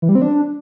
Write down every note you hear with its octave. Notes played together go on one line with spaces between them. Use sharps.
E3
G3
C4
D4